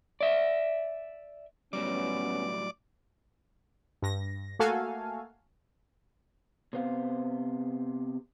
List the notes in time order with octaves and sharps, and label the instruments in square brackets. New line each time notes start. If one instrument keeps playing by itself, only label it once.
[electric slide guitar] D5 E5
[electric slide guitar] A2 F#3 G3 [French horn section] B3 C#4 [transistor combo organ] D5 D6
[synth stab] G2 A#6
A3 A#3 F#4 A4 F5 G#5
[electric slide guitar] C3 B3 C5 F5